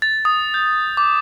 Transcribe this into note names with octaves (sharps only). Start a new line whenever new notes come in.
A6
D#6
G6
D6